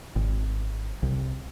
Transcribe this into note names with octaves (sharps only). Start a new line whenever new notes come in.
G#1
C2